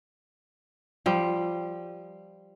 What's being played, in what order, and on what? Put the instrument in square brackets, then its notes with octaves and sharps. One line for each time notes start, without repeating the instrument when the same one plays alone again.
[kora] F3 G3